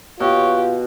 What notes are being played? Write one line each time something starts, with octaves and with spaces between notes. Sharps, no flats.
B2 F4 G4 C#5